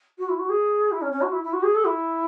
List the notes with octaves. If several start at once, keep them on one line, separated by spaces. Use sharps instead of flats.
F#4
E4
F#4
G#4
E4
C#4
C#4
F#4
E4
E4
F#4
G#4
A4
E4